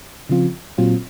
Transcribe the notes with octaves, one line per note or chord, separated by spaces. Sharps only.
C#3 F3 C4 F4
A#2 F#3 C4 F4